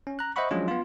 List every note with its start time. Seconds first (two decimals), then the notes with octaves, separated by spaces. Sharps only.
0.07 C#4
0.19 A#5 F#6
0.36 C5 D#5 E5 F#5 B5 C#6
0.51 F3 F#3 G#3 C#4 D4 F4
0.68 B3 F4